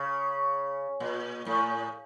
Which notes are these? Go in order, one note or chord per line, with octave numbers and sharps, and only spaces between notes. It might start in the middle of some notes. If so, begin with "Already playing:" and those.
Already playing: C#3
A#2
A2